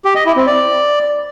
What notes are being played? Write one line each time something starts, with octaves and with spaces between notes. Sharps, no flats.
G4
D#5
E4
C4
D5